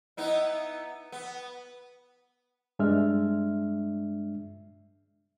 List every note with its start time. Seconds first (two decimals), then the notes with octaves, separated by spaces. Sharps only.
0.17 B3 D#4 E4
1.12 B3
2.79 G2 G#3 D4 E5 F6